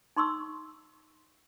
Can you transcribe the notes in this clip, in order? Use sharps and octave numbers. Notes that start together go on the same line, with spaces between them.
D#4 C6 C#6 E6